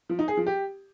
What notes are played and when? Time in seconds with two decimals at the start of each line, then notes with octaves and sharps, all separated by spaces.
0.09 F3
0.19 D#4
0.28 G#4
0.37 F3
0.46 G4